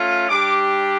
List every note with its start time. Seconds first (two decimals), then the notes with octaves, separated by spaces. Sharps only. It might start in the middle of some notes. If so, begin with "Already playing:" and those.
Already playing: A3 C#4 F4
0.28 G3 D4 G4 D6